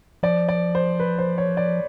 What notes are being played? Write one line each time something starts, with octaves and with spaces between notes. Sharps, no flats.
F3 D5
D5
C5
B4
C5
C#5
D5